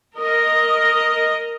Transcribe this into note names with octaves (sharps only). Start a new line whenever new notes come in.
A#4 D#5